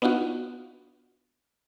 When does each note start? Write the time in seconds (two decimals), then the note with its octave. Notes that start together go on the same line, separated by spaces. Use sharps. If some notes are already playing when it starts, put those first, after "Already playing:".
0.02 B3 D4 D#4 F4 F#4